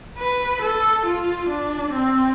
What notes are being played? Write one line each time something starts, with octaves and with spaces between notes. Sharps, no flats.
B4
A4
F4
D4
C4